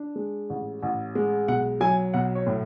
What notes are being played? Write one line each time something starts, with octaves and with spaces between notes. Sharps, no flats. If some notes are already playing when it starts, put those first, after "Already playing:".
Already playing: D4
G#3
A1
A1
G#3
B1 F#5
F#3 G#5
B1 F#5
C#5
A2